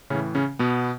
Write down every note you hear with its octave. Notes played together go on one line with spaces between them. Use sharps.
A2 C#3 E3 C#4
C#3 C#4
B2 B3